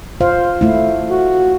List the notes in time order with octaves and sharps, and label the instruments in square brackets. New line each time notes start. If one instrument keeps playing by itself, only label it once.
[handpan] F4 C5 F5
A3 E4
[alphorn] F#4